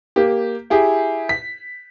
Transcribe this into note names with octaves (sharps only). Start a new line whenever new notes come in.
A#3 G4
E4 G4 G#4
B6